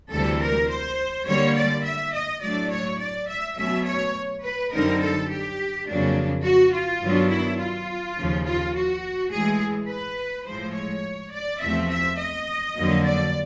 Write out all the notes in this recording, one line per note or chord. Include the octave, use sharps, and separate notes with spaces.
D2 C3 E3 G3 A4
A#4
C5
D3 G3 A#3 C#5
D5
E5
D#5
A2 F#3 A3 D4 D5
C#5
D5
E5
B2 F#3 A3 C#4 E5
C#5
B4
F#2 D3 G3 C4 D#4 A#4
A4
G4
F2 C#3 F#3 A#3 D4
F#4
F4
G2 D#3 F#3 B3 D4
E4
F4
D#2 C#3 F3
F4
F#4
A2 E3 G#3 G#4
B4
A2 F3 G#3 C5
C#5
D5
E2 C3 F3 A3 C4 E5
E5
D#5
F2 D3 F#3 A#3
D5